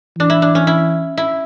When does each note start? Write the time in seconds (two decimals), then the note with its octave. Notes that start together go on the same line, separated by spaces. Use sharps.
0.17 E3 D4
0.30 E4
0.42 D4
0.55 C#4
0.67 E4
1.17 E4